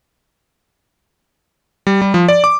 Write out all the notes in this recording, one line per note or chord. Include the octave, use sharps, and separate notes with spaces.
G3
G3
F3
D5
D6